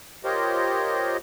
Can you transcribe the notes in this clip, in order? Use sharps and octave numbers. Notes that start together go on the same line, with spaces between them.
F4 G4 A#4 C5 C#5 D#5